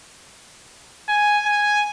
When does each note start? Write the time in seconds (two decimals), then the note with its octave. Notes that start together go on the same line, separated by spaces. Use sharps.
1.09 G#5
1.45 G#5